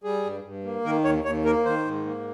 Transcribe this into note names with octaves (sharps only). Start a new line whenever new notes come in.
G3 G#4
G2
G2
A#3
D#3 A#4
D#2 C#5
D#2 C#5
A#3 A#4
D#3 C5
G#2
A#3